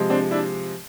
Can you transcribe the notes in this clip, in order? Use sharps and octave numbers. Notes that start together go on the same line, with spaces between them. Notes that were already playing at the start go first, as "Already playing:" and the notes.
Already playing: C3 F3 G#3
C4 D4
D4 E4